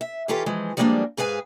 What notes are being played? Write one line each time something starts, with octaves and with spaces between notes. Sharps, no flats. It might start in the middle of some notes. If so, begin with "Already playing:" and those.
E5
E3 C#4 F4 G4 A4 B4
E3 F3 G#3
F3 G3 G#3 A#3 C4 D4
G#2 G#4 B4 F5 G#5